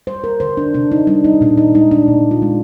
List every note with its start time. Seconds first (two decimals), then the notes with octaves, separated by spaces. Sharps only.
0.07 G3 C5
0.24 A#4
0.40 D3 C5
0.57 D4
0.74 C3 D4
0.92 D#4
1.07 G3 D4
1.24 D#4
1.41 A#2 D4
1.57 D#4
1.75 G#3 D#4
1.91 D4
2.08 A#2
2.31 F4
2.42 G#3